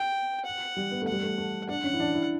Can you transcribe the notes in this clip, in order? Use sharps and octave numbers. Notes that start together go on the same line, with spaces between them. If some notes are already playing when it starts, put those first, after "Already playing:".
Already playing: G5
F#5
G3
B3
A3
G3 F#5
A3
A3
D4 F#5
C#4
E4
D4
E4